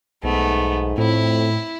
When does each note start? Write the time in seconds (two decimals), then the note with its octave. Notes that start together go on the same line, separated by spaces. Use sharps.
0.23 B1 G#2 A3 B3
0.98 F2 A2 C4 E4